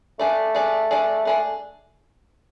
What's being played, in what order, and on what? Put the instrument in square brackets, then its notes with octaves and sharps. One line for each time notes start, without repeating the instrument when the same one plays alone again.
[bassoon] A3 [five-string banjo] D4 G#4 D5
[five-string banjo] D4 G#4 D5
D4 G#4 D5
[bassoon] A3 [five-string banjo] D4 G#4 D5